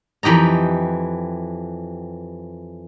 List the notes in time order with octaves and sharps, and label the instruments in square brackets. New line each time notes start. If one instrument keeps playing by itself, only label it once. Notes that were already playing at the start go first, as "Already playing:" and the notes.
[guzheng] F2 E3 G4 D#5 A#5